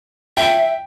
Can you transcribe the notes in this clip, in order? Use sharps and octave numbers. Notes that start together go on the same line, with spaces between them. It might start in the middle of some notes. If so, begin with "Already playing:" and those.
E5 G5